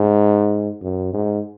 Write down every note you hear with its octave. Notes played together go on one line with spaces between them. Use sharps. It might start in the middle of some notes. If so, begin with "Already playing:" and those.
Already playing: G#2
F#2
G#2